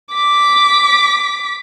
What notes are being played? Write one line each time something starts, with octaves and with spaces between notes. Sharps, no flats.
D6 B6